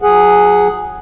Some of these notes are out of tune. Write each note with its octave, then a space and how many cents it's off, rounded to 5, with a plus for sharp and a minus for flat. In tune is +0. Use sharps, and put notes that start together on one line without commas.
F#3 -35 G#4 +0 F#5 +0